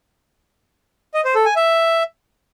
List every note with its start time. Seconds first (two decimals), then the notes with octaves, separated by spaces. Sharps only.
1.14 D#5
1.25 C5
1.35 A4
1.46 G#5
1.56 E5